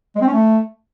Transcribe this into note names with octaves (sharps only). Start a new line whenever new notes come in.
G#3
C4
C#4
A3